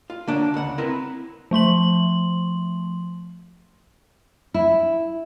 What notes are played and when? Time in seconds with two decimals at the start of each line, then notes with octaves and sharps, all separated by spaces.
0.10 F4
0.27 D3 A#3 C#4 D4
0.54 C#2 F#5
0.78 C4 E4 A#4 B4
1.51 F3 A3 C6 F#7
4.54 E4